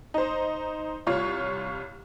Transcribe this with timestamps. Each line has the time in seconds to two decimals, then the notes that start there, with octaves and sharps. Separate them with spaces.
0.14 D#4 C5
1.07 C2 F4 C#5